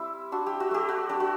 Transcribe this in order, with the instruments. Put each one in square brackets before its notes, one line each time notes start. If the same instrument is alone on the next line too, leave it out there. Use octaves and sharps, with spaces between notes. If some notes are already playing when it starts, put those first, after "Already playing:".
Already playing: [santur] G3 C4 E4
D4 F#4
G4
F#4
A3 G4
F#4
D4 G4
F#4